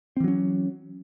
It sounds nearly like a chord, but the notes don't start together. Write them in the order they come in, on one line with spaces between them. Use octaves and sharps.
C4 E3 F#3 C#4